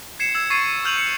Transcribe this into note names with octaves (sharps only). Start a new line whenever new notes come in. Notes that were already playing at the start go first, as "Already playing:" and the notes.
G#6 C7 C#7 E7
E6 G#6
C#6 G#6 A6 C7 D#7
C#6 F6 G6 F7 F#7
C#7